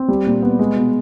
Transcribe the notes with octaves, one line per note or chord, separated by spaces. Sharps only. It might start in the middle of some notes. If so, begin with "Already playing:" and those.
Already playing: C4
G3
A#2
B3
G#3
B2